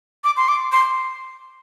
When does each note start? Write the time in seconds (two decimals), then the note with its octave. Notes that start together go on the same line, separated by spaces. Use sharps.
0.24 D6
0.37 C6
0.48 D6
0.72 C6